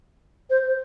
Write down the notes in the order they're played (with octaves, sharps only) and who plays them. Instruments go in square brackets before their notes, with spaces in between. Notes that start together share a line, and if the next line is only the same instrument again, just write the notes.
[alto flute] C5